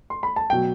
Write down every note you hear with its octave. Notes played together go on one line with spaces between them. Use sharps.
C6
B5
A5
B2 F#3 G5